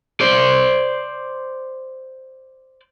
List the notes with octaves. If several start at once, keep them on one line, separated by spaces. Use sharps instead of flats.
C5 D5